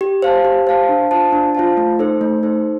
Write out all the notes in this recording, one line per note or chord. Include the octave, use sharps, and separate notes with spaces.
G4
C5 F5 A5
G4
C5 F5 A5
D4
F4 C5 F5 A5
D4
F4 C5 F5 A5
A3
D#4 A4 C5
A3
D#4 A4 C5